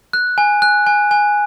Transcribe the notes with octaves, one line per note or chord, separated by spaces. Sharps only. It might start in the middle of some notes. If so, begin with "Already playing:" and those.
F#6
G#5
F#6
G#5
G#5